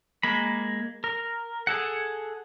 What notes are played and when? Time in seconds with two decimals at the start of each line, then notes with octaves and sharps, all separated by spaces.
0.23 G#3 A#3 B5
1.04 A#4
1.67 G#4 A4 F#5